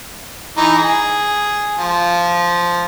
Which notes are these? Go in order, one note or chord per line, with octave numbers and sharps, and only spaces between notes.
E3 D#4
G#4
F3